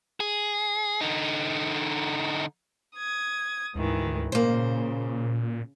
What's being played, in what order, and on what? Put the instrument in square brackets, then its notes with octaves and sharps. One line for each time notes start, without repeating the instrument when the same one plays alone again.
[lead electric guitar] G#4
D3 D#4
[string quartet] D#6 G#6
[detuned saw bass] D2 [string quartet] G#2 D#3 E3
[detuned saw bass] A#2 [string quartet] C#3 [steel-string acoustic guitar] A#3 C5